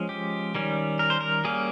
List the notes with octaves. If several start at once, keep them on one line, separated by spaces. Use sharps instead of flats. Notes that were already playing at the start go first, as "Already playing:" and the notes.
Already playing: F3 G#3 C#4
G4
D#3 G3 C#4
A#4
C5
A#4
G3 A#3 C#4 G#4